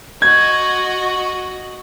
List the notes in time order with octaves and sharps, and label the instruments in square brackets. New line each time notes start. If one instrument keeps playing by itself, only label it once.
[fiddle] F#4 D#5 [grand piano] G#6